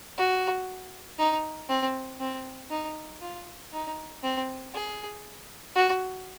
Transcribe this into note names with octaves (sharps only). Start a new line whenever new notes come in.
F#4
D#4
C4
C4
D#4
F4
D#4
C4
G#4
F#4